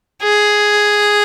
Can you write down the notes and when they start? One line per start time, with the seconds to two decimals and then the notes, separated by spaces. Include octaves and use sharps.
0.23 G#4